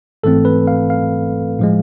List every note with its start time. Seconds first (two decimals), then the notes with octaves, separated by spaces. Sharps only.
0.23 G#1 G#2 E3 A3 C4 A4
0.45 B4
0.67 F5
0.90 F5
1.59 A2 F3 G#3